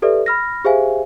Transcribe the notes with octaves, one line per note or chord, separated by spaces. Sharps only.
G4 A4 B4 D5 E5
B5 F6 A#6
G4 G#4 C5 E5 F5 G#5